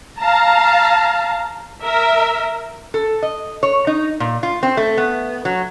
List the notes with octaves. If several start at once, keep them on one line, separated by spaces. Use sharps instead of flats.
F5 A5 A#5
A#4 E5
A4
D#5
C#5
D#4
A#2
F4
C4
A3
B3
F#3